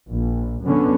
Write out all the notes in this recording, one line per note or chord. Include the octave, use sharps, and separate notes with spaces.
A#1
F#2 D3 B3 C#4